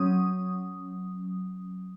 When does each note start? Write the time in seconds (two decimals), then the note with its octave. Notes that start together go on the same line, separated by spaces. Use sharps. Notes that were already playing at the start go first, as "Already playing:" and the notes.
Already playing: F#3 C#4 D#6